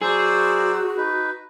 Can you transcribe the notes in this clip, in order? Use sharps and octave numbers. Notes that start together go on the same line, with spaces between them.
F#3 F#4 G#4 C5 D5 E6
D#4 B4